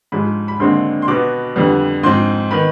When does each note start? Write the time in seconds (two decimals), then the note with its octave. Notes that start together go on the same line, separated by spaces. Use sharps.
0.12 G#2 F3 G#3 B5
0.48 B5
0.60 D#2 D3 G#3 C4 C6
1.02 C6
1.08 B2 B3 D6
1.56 F2 D3 G3 B3
2.03 G#2 F3 C4 C6
2.51 D#3 B3 B5